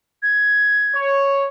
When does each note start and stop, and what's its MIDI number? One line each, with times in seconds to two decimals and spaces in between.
0.23 0.99 92
0.95 1.48 73